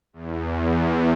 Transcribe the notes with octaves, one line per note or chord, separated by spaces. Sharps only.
E2